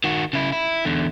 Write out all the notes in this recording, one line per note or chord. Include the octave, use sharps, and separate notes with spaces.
D#3 F#4
C#3 E4
E4
E2 D3